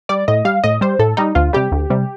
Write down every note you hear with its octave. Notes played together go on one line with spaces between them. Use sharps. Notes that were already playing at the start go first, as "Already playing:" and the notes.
G3 D5
A2 D#5
G3 F5
A2 D#5
G3 C5
A2 A4
G3 D#4
D2 F4
C3 G3 G4
D2
C3 G3